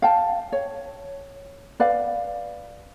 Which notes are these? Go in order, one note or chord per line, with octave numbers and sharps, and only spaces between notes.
F5 G5 A5
C#5
B4 D5 F5